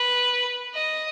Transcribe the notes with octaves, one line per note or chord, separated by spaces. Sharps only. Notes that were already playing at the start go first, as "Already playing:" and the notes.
Already playing: B4
D#5